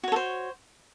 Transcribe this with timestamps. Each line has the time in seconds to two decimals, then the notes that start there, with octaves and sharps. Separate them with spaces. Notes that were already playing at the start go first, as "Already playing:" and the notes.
0.04 F#4
0.08 C#5
0.12 A4
0.16 C5